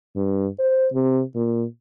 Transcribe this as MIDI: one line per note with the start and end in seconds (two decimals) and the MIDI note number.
0.16 0.47 43
0.59 0.87 72
0.93 1.22 48
1.35 1.64 46